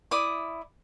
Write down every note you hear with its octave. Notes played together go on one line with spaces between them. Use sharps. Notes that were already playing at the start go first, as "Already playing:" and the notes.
E4 D5 D6 D#6